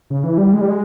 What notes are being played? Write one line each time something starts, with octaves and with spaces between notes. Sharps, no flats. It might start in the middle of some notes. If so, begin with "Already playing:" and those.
C#3
E3
G3
G#3
G3
G#3